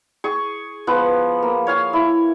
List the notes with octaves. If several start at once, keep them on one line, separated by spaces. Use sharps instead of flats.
G#4 C#6
F3 B3 F#5
A#3
C#5 F5 G#5
E4